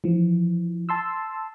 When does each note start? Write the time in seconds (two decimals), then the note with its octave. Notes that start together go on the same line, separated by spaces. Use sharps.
0.04 E3 F3
0.89 A5 C6 E6